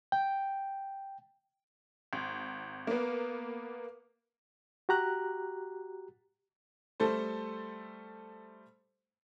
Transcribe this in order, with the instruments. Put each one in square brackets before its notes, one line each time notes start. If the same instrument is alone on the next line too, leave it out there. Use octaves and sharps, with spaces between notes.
[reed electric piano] G5
[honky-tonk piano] G#1
A#3 B3
[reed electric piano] F#4 G4 A#5 F#6
[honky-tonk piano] G3 A3 A4 C5